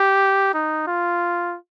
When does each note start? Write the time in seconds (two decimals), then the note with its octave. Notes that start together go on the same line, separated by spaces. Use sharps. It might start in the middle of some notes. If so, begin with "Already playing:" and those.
Already playing: G4
0.54 D#4
0.88 F4